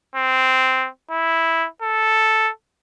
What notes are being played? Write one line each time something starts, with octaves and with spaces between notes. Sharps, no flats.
C4
E4
A4